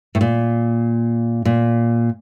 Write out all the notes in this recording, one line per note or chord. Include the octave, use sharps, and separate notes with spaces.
A2
A#2
A#2